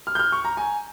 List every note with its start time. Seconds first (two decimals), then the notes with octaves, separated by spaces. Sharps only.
0.07 F6
0.15 G6
0.19 F6
0.32 C#6
0.45 A#5
0.57 G#5